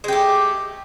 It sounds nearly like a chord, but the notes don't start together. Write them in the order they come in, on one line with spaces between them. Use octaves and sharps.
G#3 G4 A3